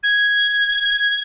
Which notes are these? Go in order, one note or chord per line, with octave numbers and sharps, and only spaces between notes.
G#6